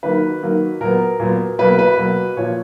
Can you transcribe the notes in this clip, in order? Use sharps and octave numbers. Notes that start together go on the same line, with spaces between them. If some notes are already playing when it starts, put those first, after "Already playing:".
D#3 F#3 A#3 B4
D#3 F#3 A#3
A#2 F#3 B3 A#4
A#2 F#3 B3
B2 F#3 A#3 B4
B4
B2 F#3 A#3
A#2 F3 A#3 C#5